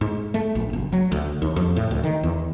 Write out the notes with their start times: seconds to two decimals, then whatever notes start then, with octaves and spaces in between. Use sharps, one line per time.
0.01 G#2
0.34 A3
0.55 A#1
0.73 F#1
0.92 F#3
1.12 D2
1.42 D#2
1.56 F2
1.76 A2
1.91 D2
2.03 D#3
2.23 E2